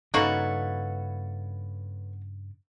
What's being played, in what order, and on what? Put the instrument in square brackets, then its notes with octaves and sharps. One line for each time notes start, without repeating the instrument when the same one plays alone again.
[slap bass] G2 C#3 [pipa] A#3 D#4 F#4 [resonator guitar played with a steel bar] C#4 A4 B4